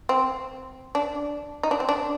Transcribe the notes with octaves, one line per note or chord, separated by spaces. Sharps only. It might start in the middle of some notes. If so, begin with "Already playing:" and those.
C4
D4
D#4
D4
C4
D4